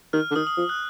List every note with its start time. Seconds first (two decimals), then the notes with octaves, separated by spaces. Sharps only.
0.13 D#3 F6
0.31 D3
0.36 D#3 D#6
0.47 D#6
0.57 F3
0.69 F#6